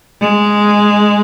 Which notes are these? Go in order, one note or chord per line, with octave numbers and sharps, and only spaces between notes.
G#3